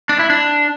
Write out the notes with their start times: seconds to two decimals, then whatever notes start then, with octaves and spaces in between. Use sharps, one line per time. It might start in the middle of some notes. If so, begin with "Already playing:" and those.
0.09 D4
0.19 E4
0.30 D4